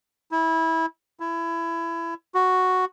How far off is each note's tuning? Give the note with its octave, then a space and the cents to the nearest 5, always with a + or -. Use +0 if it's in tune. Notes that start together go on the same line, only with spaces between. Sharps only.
E4 -20
E4 +20
F#4 +0